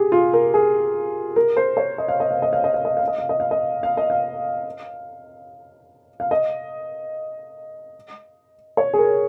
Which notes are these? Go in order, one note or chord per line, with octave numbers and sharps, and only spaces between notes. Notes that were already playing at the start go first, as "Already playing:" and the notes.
Already playing: G4 G#4
F4
A#4
G#4
A#4
C5
C#5
D#5
F5
D#5
F5
D#5
F5
D#5
F5
D#5
F5
D#5
F5
D#5
F5
D#5
F5
D#5
F5
F5
D#5
C#5
G#4
A#4